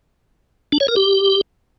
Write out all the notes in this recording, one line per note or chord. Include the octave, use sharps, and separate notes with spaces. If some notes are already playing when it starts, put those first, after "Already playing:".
D4
C#5
A#4
G4